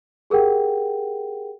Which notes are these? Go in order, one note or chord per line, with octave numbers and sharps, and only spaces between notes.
G4 G#4 A#4 F#5 G5